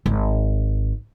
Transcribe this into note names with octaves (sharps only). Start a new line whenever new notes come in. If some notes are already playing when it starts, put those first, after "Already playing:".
G#1